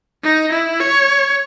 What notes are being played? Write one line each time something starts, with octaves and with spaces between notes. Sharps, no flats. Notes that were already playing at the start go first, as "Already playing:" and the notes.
D#4
E4
C#5